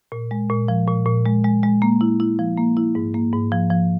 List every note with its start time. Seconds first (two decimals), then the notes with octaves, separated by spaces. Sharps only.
0.12 A#2
0.31 G#3
0.50 A#2
0.68 F3
0.88 A#2
1.06 A#2
1.26 G#3
1.44 G#3
1.63 G#3
1.82 A#3
2.01 E4
2.20 E4
2.39 F3
2.58 A#3
2.77 E4
2.95 G#2
3.14 A#3
3.33 G#2
3.52 F3
3.70 F3